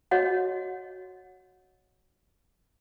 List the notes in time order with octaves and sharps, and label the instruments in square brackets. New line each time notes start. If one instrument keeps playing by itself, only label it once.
[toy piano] F#4 C#5 D#5 F#5